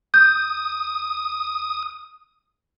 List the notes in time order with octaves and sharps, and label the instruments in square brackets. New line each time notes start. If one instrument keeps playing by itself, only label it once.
[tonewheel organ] D#6 [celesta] G6